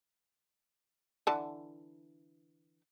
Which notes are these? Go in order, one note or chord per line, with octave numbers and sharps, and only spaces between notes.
D3 E3 A5